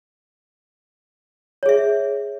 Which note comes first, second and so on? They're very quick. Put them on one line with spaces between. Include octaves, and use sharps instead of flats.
C#5 G#4 E5